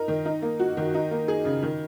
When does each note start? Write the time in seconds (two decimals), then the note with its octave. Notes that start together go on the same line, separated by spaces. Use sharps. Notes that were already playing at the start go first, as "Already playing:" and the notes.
Already playing: D#4 A#4
0.08 D#3
0.25 D#4
0.42 A#3
0.60 F#4
0.77 D#3
0.94 D#4
1.11 A#3
1.28 G#4
1.45 C#3
1.63 D#3